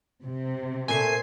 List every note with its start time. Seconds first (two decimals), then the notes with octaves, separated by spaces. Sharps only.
0.23 C3
0.88 A#2 A3 C5 G#5 C7